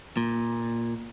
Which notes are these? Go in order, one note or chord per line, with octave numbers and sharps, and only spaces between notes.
A#2